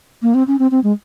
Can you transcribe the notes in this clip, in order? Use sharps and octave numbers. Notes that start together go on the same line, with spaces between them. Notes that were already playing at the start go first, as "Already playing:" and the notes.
A#3
C4
C#4
C4
C4
G#3